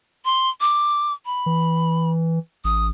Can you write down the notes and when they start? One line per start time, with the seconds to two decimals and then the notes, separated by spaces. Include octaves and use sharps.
0.25 C6
0.61 D6
1.26 B5
1.46 E3
2.65 A1 D#6